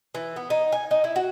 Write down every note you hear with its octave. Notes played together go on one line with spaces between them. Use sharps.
E3
B3
D#4
G#5
D#4
E4
F#4